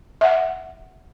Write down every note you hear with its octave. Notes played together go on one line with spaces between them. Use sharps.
E5 F#5